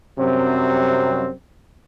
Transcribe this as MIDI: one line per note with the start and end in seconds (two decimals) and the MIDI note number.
0.19 1.31 42
0.19 1.31 48
0.19 1.31 54
0.19 1.31 55
0.19 1.31 60